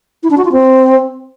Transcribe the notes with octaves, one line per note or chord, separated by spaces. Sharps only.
E4
D4
F#4
F4
C4